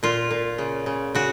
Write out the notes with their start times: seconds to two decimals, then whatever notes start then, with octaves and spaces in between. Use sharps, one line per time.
0.03 A#2 F4
0.31 A#2
0.58 C#3
0.86 C#3
1.15 C#3 F#4